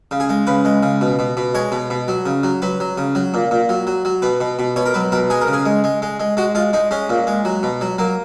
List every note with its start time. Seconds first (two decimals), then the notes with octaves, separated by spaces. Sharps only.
0.11 C#3
0.20 G#4
0.29 G#3
0.47 C#3 B4
0.65 G#3
0.83 C#3
1.01 B2
1.19 B2
1.37 B2
1.55 G#3 C#5
1.72 B2
1.90 B2
2.08 F#3
2.26 C#3
2.43 F#3
2.62 F#3 B4
2.80 F#3
2.98 C#3
3.15 F#3
3.34 A#2
3.51 A#2
3.69 F#3
3.87 F#3
4.05 F#3
4.22 B2 B4
4.41 B2
4.59 B2
4.76 B2 C#5
4.86 A#4
4.94 F#3 B4
5.12 B2 A#4
5.30 G#3 G#4
5.41 A#4
5.48 C#3
5.53 G#4
5.65 G#3
5.84 G#3
6.02 G#3
6.20 G#3
6.37 G#3 F#4
6.55 G#3 F4
6.73 G#3 D#4
6.91 G#3 C#4
7.10 A#2
7.27 G#3
7.45 F#3
7.63 B2
7.81 F#3
7.98 F#3 A#3